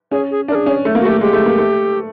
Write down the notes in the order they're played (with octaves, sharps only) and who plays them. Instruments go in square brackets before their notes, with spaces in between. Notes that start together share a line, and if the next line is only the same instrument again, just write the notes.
[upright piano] C#4 [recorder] G#4
[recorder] G#4
[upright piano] D4 [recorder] A#4
[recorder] G#4
[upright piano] C#4
A3
A#3
[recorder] F#4
[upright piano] A3 [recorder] G4
[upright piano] G#3 [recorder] G4
[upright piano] A3
A#3
A3